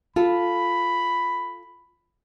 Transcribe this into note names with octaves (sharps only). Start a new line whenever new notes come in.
F4 A4 B5